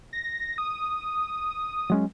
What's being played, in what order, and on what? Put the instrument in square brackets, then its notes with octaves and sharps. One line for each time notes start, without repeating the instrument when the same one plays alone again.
[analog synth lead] A#6
D#6
[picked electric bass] F#3 G#3 C#4